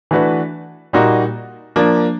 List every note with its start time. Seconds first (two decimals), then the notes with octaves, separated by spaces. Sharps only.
0.11 E3 A3 D4 F#4 B4
0.93 A#2 G3 A#3 D#4 F#4
1.76 F3 A#3 D4